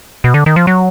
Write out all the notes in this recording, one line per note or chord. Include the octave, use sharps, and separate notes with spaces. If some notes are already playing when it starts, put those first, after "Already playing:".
B2
D3
D#3
F3
F#3